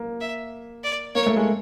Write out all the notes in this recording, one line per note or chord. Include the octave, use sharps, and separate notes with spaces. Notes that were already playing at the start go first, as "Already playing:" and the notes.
Already playing: A#3
E5
D5
A#3 C#5
A3
G#3